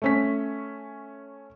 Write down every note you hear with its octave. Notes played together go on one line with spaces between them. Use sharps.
A3 C#4 B6